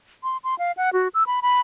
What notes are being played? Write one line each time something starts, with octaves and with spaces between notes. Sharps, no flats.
C6
C6
F5
F#5
F#4
E6
B5
B5